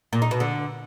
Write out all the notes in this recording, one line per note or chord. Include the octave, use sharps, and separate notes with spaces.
A#2
D#4
B2
D3